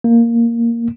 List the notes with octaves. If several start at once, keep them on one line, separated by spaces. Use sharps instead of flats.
A#3